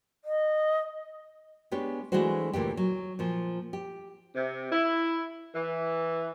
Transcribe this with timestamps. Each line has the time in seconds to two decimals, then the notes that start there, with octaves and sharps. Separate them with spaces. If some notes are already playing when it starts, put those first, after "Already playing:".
0.25 D#5
1.71 G#3 B3 D4 G4 C#5
2.12 E3 G#3 A3 D4 F#4 C5
2.53 D2 A#2 E3 G4
2.77 F#3
3.19 A#2 F3
3.73 G4
4.36 C3
4.71 E4
5.54 E3